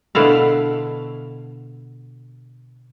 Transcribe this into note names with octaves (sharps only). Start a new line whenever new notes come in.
B2 D3 E4 F5